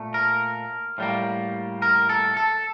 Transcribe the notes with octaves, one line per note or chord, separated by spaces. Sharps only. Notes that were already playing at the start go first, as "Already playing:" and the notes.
Already playing: A#2 A3
A#4
A2 G3 A#3
A#4
A4
A4